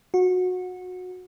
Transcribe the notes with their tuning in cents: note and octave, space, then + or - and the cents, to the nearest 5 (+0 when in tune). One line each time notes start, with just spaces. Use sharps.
F#4 -20